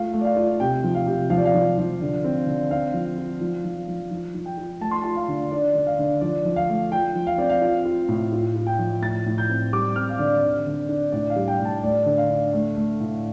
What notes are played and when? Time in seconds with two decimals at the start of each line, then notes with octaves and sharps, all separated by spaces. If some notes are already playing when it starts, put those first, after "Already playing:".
Already playing: A3 F4 F5
0.13 A3
0.21 D5
0.25 F5
0.36 F4
0.60 C3 G5
0.84 F3
0.95 F5
1.07 C3
1.30 F3 F5
1.38 D5
1.45 F5
1.54 F3
1.78 F3
2.01 D3
2.24 C4
2.47 D3
2.71 C4 F5
2.94 F3
3.18 F4
3.41 F3
3.64 F3
3.88 F3
4.11 F3
4.34 F3
4.46 G5
4.58 F4
4.81 A3 A5
4.91 C6
5.02 F4 A5
5.16 F5
5.28 D3
5.51 D4 D5
5.75 D3
5.87 F5
5.99 D3
6.21 F3 D5
6.45 F3
6.56 F5
6.69 A3
6.91 F4 G5
7.15 F3
7.27 F5
7.38 C4 D5
7.50 F5
7.62 F4
7.85 F4
8.09 A2
8.32 F4
8.56 F4
8.67 G5
8.79 F3
9.02 A2 A6
9.26 A2
9.38 G6
9.49 C4
9.73 G3 D6
9.95 C4 F6
10.09 F5
10.19 D3 D5
10.43 D3
10.67 D3
10.89 D4
11.12 A2 D5
11.30 F5
11.36 G3
11.48 G5
11.59 A2
11.65 A5
11.83 A3 D5
12.06 D3
12.17 F5
12.30 D4
12.53 A3
12.77 A3
13.00 A2